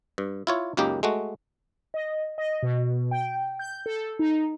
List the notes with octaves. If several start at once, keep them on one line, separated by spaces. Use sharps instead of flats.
G2
E4 F4 C#5
C#2 F#2 A#3 D#4 G4
G#3 A3 F#4
D#5
D#5
B2
G5
G6
A4
D#4